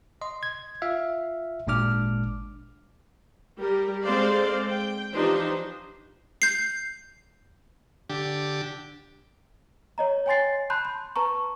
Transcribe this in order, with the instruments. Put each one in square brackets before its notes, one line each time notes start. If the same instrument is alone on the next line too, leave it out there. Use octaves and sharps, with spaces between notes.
[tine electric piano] D#5 C6
G#6
F4 E5 F5
G#1 A#2 G#3 D4 D6 F6
[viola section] G3 G4 A#4
G#3 C4 A4 C5 D5 F5
G5
E3 F3 D4 D#4 G4 C5
[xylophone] G6 C7
[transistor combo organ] D3 G4
[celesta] C#5 D#5 A#5
C#5 G5 G#5 C6 A6 C7
A5 B5 C6 F#6 G6
C6
B4 A5 A#5 C#6